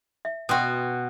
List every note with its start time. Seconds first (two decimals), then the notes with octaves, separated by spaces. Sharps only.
0.25 E5
0.49 B2 F#4 G5 C6 D#6